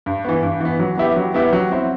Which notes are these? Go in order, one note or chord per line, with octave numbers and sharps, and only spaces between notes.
G2
E3 B3
G2
E3 B3
F#3
B3 E4 G4
F#3
B3 E4 G4
F#3
C4 E4